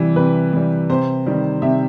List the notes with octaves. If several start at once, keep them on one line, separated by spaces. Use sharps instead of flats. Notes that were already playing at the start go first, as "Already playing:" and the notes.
Already playing: C3 E3 G3
C3 B4
E3 G3
C3 C5
D#3 G3
C3 E5